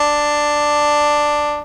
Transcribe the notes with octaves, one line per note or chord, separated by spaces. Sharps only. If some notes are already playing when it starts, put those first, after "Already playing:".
Already playing: D4